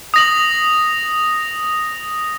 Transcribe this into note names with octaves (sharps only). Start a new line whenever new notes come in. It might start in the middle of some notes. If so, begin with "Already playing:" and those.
D#6 A#6 F#7